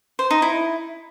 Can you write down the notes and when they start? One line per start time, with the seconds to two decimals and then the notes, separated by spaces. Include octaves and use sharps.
0.19 C5
0.31 D#4
0.42 E4